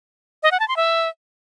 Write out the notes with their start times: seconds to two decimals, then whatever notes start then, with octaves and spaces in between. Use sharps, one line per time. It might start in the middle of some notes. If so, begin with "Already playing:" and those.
0.43 D#5
0.51 F#5
0.60 A5
0.68 C6
0.76 E5